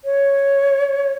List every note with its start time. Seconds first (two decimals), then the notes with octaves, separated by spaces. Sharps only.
0.05 C#5